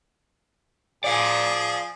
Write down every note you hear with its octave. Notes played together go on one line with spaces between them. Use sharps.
F3 G#4 D5 F5